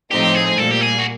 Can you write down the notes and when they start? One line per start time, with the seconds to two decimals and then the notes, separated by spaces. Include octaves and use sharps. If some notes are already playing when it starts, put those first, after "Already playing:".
0.11 A2 F3 A3 C4 D#4 G4
0.35 G#4
0.57 A#2 G3 A#3 A4
0.71 G4
0.81 G#4
0.99 F#4